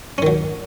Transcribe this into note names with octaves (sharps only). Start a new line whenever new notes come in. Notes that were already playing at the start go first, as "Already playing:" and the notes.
D#3 F#3 C#4